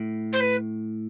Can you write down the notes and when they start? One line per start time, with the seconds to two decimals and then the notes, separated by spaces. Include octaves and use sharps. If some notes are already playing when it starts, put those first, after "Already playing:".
Already playing: A2
0.32 C5
0.39 B4